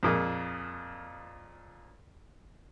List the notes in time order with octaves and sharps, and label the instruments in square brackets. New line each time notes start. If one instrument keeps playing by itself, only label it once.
[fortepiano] F2 A#2 G#4